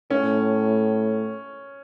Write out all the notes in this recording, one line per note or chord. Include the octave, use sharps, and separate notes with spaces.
A2 C#4